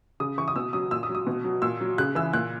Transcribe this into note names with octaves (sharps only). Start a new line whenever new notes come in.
C#3 D#6
E3 C#6
D#6
B2 E6
F#3 D#6
A#2 E6
D#6
F#3
D#6
B2
F#3
A#2 E6
F#3
C#3 F#6
E3 E6
A#2 F#6